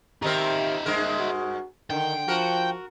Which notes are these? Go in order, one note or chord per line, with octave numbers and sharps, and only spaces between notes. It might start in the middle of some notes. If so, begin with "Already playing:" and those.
D#3 C4 D#4 G4 A#4 E5
G2 G#3 A#4
F#4
D3 D#3 G5
F3 F#4 A#4